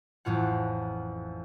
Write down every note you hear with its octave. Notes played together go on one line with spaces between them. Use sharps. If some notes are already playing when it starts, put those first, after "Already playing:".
A1 F2 A2 F4 F#5